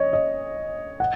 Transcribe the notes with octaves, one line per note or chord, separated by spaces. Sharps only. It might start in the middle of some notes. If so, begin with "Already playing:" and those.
Already playing: C#5 D#5
D#5
F#5